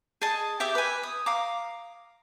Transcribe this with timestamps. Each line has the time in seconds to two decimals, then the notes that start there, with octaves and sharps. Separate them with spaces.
0.21 G#4 D#5 A5
0.60 G4 E5 D6
0.75 B4 G#5
1.03 D#6
1.26 F5 A#5 D6